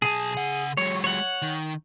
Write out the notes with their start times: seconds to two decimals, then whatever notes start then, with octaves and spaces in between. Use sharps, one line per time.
0.02 B1 G#4 A5
0.37 C#3 F#5
0.77 F#3 G#3 C#5
1.04 C#5 F#5
1.42 D#3